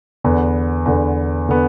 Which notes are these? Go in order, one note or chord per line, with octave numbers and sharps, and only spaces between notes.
E2 D3 B3
E2 D3 B3
D3 B3